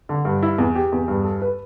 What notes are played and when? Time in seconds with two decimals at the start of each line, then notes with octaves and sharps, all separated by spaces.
0.09 D3
0.25 G2
0.43 E4
0.58 E2
0.75 G4
0.92 E2
1.08 G2
1.24 A4
1.42 B4